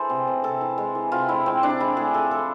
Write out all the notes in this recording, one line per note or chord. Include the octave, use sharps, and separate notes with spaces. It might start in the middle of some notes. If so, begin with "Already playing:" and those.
Already playing: E3 G#4 A4 C5
C3
C3
C3 A4
E3
G#3
E3
C3 F4
G#3 E4
G#3 C4
C3 D4
G#3 E4
A2 G#4
F3 A4
F3 A4